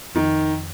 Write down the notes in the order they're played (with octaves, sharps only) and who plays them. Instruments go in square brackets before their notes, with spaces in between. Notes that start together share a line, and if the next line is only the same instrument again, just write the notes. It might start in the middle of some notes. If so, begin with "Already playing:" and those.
[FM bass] F2 [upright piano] D#3